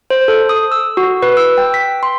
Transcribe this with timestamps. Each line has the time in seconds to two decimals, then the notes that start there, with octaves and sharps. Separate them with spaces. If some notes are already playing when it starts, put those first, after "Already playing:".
0.10 C5
0.28 A4
0.49 D#6
0.72 E6
0.97 F#4
1.22 B4
1.37 E6
1.58 G5
1.74 B6
2.03 C6